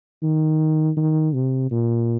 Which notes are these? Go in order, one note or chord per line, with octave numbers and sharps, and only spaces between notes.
D#3
D#3
C3
A#2